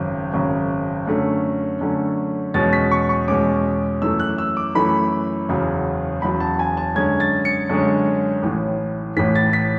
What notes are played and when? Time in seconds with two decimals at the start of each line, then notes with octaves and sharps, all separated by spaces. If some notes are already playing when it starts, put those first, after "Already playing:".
Already playing: G#1 F#2 C#3
0.34 G#1 F#2 C#3
1.07 F#2 D3 A3 C#4
1.81 F#2 D3 A3 C#4
2.54 E2 B2 G#3 C#4 A6
2.73 B6
2.91 C#6
3.09 C#6
3.28 E2 B2 G#3 C#4 D6
4.02 F#2 E3 A3 E6
4.20 F#6
4.38 E6
4.57 D6
4.75 F#2 E3 A3 B5
5.49 F#1 E2 C#3 F#3
6.22 F#1 E2 C#3 F#3 B5
6.40 A5
6.59 G#5
6.77 A5
6.96 F#2 D3 G#3 C#4 G#6
7.20 A6
7.45 C#7
7.69 F#2 D3 G#3 C#4
8.43 A1 A2 E3
9.17 A1 A2 E3 B6
9.35 A6
9.53 B6